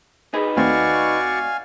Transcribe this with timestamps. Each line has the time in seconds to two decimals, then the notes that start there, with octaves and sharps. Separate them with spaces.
0.34 D#4 G#4 B4
0.57 D#2 A3 C4 F#4 D5 F5 G#5 C#6